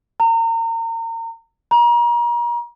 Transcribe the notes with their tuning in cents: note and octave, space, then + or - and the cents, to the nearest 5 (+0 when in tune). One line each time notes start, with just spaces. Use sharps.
A#5 -35
A#5 +35